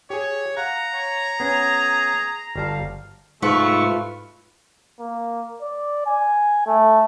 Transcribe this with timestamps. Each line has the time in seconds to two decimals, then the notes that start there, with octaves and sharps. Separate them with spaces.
0.10 G4 G#4 C#5
0.57 F5 F#5 A#5
0.93 C#5
1.40 B3 C#4 G#4
2.56 G1 G3 F5 A5
3.42 G#2 C3 G3 A3 F4 B4 C#6
5.00 A#3
5.62 D5
6.06 G#5
6.67 A3